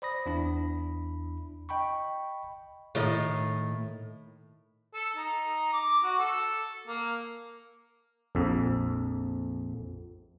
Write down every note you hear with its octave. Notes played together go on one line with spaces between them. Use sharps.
C5 D5 B5 D#6 A#6
E2 D4 E4 B5
D#5 G5 B5 C#6
A2 D#3 D#5
A4
D#4
D6
F#4
A4
A#3
A#1 F2